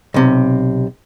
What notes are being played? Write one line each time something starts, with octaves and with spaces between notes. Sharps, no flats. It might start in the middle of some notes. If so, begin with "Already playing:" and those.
B1 C3